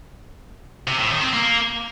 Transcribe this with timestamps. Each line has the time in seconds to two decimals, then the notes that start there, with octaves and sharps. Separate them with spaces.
0.87 C3
0.99 A2
1.10 D#3
1.22 C4
1.33 A#3